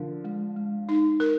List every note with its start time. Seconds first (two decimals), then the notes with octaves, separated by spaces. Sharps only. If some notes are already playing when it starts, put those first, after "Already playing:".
Already playing: D3 F3 A#4
0.24 G#3
0.56 G#3
0.89 D#4
1.20 A#4